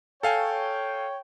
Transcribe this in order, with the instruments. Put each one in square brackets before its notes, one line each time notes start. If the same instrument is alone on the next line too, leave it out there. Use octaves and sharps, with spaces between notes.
[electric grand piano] A4 F5 G#5 [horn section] C#5 G5